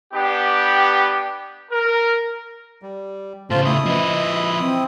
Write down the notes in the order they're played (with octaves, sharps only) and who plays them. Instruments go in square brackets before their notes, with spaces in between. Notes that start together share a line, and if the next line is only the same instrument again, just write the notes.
[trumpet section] B3 D4 G4
A#4
[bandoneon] G3
[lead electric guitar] A2 C#3 [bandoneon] F4 A5 [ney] C5
[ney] A3 [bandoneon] E4 D#6
[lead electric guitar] F3 B4 [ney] D#5
[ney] C4